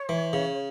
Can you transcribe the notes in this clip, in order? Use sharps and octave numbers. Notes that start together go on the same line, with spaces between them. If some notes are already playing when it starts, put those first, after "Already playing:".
Already playing: C#5
E3
C#3